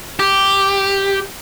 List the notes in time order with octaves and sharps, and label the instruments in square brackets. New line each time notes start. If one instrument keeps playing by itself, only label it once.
[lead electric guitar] G4